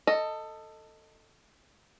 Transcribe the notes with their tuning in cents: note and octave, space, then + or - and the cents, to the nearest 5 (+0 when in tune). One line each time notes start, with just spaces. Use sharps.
A4 +15 D#5 +0